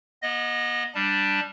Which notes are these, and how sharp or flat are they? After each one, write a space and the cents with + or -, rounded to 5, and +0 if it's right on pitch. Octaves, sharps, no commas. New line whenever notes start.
B3 -30 D#5 +0
G3 +0 D4 +0 A5 +0